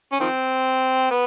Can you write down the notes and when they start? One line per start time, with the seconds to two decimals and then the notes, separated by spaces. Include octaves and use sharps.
0.12 C#4
0.20 D#3 F3 C4
1.11 B3